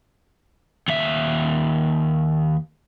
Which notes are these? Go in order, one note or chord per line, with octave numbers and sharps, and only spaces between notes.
D#2 E5